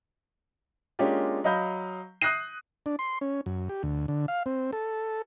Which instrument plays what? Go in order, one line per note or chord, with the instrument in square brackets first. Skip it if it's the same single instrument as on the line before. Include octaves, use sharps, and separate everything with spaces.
[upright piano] G#3 A#3 C#4 D4 F4 G4
F#3 D#5 F5 B5 G6
D#6 F#6 G6 A#6 C7 D#7
[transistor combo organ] D4
C6
C#4
F#2
G4
D2
D3
F5
C4
A4